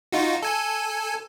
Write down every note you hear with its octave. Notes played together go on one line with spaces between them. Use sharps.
D#4 F4 F#4
A4 G#5